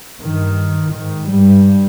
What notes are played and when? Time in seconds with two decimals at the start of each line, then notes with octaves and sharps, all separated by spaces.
0.21 G2 D#3
0.93 G#2 D#3
1.29 G2 G3